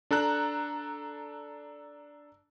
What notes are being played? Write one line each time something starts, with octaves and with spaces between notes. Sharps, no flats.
D4 A4 A#5 F#6